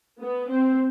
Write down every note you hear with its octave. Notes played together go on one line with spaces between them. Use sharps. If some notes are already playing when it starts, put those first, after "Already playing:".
B3
C4